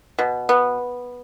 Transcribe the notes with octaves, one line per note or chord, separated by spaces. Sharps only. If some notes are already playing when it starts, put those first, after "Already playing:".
B2
B3